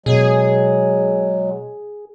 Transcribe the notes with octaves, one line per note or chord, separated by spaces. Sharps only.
B2 F#3 G#3 G#4